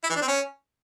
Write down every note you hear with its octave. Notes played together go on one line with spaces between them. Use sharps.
E4
E3
D4
C4
C#4